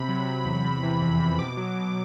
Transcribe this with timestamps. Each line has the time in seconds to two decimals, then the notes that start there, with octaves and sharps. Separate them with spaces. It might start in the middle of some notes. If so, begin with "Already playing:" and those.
Already playing: C3 B5
0.09 F#3
0.27 F#3
0.45 E2
0.64 C3
0.83 E3
1.02 F2
1.20 C3
1.38 B2 D6
1.57 F#3
1.76 B2